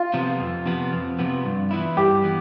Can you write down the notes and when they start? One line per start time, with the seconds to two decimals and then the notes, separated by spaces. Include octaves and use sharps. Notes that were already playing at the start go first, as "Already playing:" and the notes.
Already playing: F4
0.14 C3 F3 B3
0.40 F2
0.66 C3 F3 B3
0.93 F2
1.19 C3 F3 B3
1.45 G2
1.71 E3 B3 E4
1.97 G2 G4
2.24 E3 B3